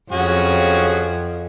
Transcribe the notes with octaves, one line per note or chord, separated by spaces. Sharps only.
F2 C#4 F#4 G#4